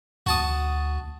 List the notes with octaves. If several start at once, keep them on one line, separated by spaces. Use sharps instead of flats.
D2 F#4 A5 D#6